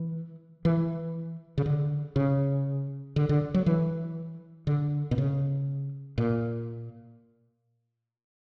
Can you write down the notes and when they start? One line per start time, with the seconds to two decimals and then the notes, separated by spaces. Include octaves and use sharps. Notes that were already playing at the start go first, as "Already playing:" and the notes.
Already playing: E3
0.65 E3
1.58 C#3
1.66 D3
2.16 C#3
3.16 D3
3.29 D3
3.54 F#3
3.66 E3
4.67 D3
5.11 B2
5.18 C#3
6.18 A#2